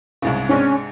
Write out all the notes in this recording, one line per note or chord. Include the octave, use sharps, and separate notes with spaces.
C2 G#2 C#3
G#2 C3 C#4 D4